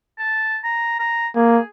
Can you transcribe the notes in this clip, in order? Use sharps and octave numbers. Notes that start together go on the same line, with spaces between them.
A5
A#5
A#5
A#3 G#4